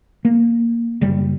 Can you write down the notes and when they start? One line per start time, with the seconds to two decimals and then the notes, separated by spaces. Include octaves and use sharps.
0.25 A#3
1.01 F#1 G3